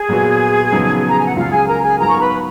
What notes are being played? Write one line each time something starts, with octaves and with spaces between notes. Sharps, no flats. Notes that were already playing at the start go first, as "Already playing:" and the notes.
Already playing: G#4
A#2 F#3 B3 F#4
F2 C#3 F#3 B3 D#4
A#5
G#5
F#5
C#2 C#3 F#3 F4 F5
G#4 G#5
A#4 A#5
G#4 G#5
G#2 F#3 B3 F4 G#4 A#4 A#5
C#6
B4 B5